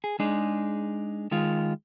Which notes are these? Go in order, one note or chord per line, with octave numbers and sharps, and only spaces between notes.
G#4
G#3 D4 D#4 G#4
D#3 G#3 F4